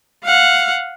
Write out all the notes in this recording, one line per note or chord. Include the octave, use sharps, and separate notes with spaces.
F5 F#5